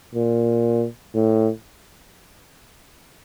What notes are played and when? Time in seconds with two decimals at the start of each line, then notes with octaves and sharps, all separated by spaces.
0.15 A#2
1.14 A2